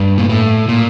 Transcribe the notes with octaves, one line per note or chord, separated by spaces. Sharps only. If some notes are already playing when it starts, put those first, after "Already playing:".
Already playing: G2
A#2
A2
A#2